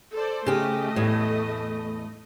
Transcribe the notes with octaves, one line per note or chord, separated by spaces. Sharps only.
A4 C5 D5
C#3 A3 G4 D#5
E2 A2